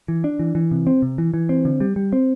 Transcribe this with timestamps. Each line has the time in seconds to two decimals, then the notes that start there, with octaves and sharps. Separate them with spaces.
0.08 E3
0.24 D4
0.39 E3
0.55 E3
0.71 C3
0.87 C4
1.02 C3
1.18 E3
1.34 E3
1.49 C4
1.65 D3
1.80 G3
1.96 G3
2.13 C4